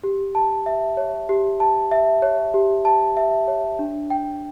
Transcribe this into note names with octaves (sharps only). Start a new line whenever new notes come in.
G4
A5
E5
C#5
G4
A5
E5
C#5
G4
A5
E5
C#5
D4
G5